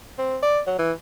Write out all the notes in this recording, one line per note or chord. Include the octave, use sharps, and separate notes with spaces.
C4
D5
F#3
E3